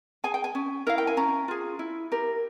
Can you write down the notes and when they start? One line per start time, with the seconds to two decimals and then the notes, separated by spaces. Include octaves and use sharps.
0.24 G#4 G#5
0.34 G5
0.44 G#5
0.55 C#4
0.87 E4 A#4 F5
0.98 G5
1.07 G#5
1.17 C#4 A#5
1.48 F4 G#4
1.79 E4
2.12 G4 A#4